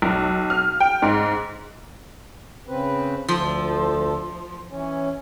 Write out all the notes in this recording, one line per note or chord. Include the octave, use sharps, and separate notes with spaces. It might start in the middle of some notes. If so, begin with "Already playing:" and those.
B1
F6
G5
G#2
C#3 C4 B4
D2 F3 A4
E3 C#4